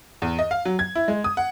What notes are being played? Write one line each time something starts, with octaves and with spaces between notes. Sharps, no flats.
E2
D#5
F5
F#3
G#6
E4
G#3
D#6
F#5